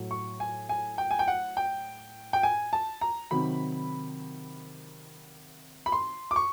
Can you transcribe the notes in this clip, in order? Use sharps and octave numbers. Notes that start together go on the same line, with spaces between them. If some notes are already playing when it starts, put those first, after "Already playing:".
Already playing: A2 F#3
C#6
G#5
G#5
G5
G#5
G5
F#5
G5
G5
G#5
A5
A#5
C3 D#3 F#3 B5
B5
C6
D6
C#6